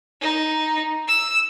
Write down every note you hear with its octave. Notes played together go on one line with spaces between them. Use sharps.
D#4
E6